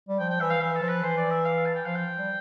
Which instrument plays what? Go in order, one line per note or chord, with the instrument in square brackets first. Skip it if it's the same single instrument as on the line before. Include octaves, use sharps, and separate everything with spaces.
[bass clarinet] G3
[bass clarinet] F3 [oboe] G5
[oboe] G5
[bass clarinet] E3 [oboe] E5
[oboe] F5
[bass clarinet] E3 [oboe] E5
[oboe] A4
[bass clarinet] F3
[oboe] B4
[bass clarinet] E3 [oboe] C5
[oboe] D5
E5
F5
A5
G5
[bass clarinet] F3 [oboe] F5
[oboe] G5
[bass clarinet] G3